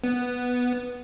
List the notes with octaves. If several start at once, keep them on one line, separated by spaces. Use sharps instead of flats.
B3